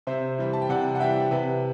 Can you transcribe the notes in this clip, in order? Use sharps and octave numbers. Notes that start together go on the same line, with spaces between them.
C3 C5 E5
E3 G3
A5
G5
C3 D5 F#5
F#5
E3 G3 E5 G5
C3 B4